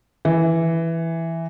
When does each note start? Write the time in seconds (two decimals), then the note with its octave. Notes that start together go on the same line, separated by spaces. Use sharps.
0.25 E3